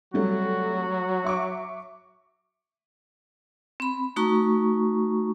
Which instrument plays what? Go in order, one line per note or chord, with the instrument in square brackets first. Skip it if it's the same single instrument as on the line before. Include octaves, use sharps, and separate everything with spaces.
[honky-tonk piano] C3 G3 A3 [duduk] F#3 [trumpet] F#4
[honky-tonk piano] E5 C#6 D6
[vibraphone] C4 B5
A3 D#4 F#4 A#5 C#6